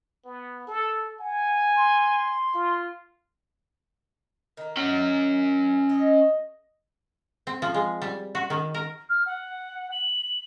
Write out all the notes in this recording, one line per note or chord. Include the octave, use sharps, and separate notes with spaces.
B3
A4
F#5 G#5
C6
F4
D#3 A#3
C#4 F#5
D#5
C4
F3
G#3
G3
F#4
D#3
A#4
F6
F#5
F#7